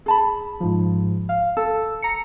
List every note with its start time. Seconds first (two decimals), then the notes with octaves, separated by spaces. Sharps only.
0.06 G#4 A5 B5
0.60 G#2 F3
1.29 F5
1.57 A4 E6
2.02 A#5 C#7